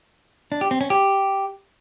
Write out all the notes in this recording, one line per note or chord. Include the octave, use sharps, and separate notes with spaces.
D4
G4
C4
C#4
G4